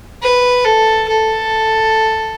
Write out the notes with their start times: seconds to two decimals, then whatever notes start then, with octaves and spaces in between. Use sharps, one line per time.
0.23 B4
0.65 A4
1.08 A4